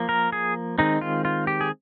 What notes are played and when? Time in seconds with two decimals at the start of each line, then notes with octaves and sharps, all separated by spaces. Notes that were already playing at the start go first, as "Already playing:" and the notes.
Already playing: F3 A#3
0.09 A#4
0.32 G#4
0.78 D#3 G#3 C4 D#4
1.01 F4
1.25 F4
1.47 G4
1.61 G#4